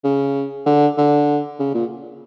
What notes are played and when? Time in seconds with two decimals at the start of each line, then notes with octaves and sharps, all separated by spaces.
0.04 C#3
0.66 D3
0.97 D3
1.59 C#3
1.74 A#2